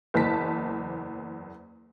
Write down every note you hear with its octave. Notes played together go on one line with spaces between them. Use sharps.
F#1 E2 C5 A5 B6